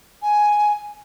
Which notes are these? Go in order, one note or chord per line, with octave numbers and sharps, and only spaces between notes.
G#5